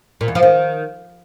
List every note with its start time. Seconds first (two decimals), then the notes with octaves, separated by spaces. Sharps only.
0.21 A#2
0.28 E2
0.35 F3
0.43 D#3